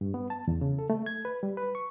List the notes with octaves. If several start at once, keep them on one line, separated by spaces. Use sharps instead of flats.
G2
B3
A5
E2
C#3
A4
A3
G#6
B4
G3
B4
C#6